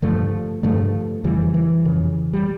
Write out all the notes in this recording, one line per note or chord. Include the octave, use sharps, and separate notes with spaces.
G2 D3 F3 A3
G2 D3 F3 A3
F2 C#3 E3 G3
E3
F2 C#3
G3